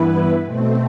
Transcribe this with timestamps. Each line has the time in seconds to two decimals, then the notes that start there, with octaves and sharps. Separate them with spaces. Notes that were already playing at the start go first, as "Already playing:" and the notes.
Already playing: G2 E3 B3 E4 B4
0.45 B2 A3 C4